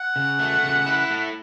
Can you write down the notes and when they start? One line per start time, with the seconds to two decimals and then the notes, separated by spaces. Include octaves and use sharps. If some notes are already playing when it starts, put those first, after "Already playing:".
Already playing: F#5
0.16 C#3
0.39 A3
0.63 C#3
0.86 E4
1.10 A3